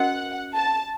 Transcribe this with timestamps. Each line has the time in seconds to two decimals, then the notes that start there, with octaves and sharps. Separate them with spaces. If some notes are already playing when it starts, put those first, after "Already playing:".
Already playing: C#4 F#4 A#4 D#5 F#5
0.55 A5